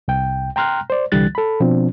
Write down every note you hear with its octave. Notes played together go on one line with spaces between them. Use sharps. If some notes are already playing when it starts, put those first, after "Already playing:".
C2 G5
G5 A#5 C6 F6 F#6
C5 D5
C2 D3 E3 G3 F#6 A6
A4 B5
B2 F3 C4 D4